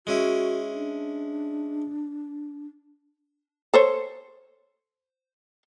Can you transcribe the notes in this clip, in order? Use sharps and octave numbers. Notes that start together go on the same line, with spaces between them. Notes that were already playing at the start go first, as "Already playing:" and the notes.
G#3 C#4 E4 F#4
D4
A4 C5 C#5